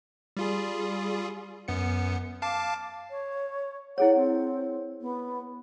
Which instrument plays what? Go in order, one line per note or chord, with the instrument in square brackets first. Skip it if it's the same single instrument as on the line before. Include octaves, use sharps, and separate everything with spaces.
[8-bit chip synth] G3 F4 G#4
F#2 B3 C#7
F5 A5 D6
[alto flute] C#5
[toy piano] E4 G#4 C#5 [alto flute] F#5
[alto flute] C4
B3